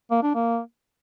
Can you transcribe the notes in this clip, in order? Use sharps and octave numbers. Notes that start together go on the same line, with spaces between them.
A#3
D4
A#3